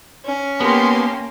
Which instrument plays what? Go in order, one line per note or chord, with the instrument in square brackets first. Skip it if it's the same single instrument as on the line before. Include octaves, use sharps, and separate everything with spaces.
[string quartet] C#4
[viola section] A#3 [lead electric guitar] B3 [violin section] G4 A5 C6